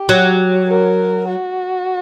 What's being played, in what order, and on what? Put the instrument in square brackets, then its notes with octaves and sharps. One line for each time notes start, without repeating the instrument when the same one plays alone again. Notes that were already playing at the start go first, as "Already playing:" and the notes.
Already playing: [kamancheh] G4
[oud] F#3
[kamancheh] A#4
F#4